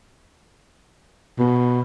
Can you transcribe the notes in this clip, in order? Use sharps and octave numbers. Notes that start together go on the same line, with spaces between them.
B2